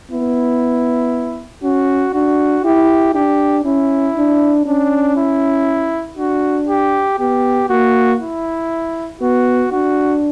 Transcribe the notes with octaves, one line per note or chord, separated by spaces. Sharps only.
B3 E4
C#4 F#4
D4 F#4
E4 G4
D4 G4
C#4 E4
D4
C#4 D4
E4
D4 F#4
G4
B3 G4
A#3 F#4
E4
B3 F#4
D4 F#4